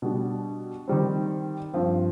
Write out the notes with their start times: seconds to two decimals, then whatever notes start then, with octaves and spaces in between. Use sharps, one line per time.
0.02 B2 G3 D4
0.88 D#3 G3 C4
1.74 G2 F3 C4